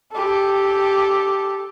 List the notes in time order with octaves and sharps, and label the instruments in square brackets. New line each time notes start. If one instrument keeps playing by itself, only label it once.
[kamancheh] G4 A4